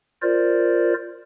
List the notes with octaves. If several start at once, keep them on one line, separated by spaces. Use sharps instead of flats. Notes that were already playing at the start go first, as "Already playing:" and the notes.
F4 A#4 C5 D5